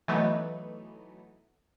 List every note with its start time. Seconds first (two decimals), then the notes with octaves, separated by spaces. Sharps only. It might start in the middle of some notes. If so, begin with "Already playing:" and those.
0.08 E3 F#3 A3 B3 D#4